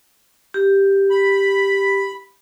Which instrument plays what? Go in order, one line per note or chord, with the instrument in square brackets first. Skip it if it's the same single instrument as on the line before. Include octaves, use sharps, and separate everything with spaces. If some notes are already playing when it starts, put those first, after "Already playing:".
[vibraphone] G4
[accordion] B5